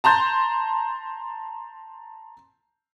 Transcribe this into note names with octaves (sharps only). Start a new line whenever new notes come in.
A5 A#5 C6 G6 A6